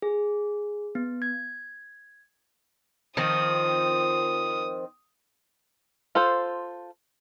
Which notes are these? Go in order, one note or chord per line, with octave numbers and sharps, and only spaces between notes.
G#4
B3
G#6
D#3 F3 C4 D#6
F4 A4 C5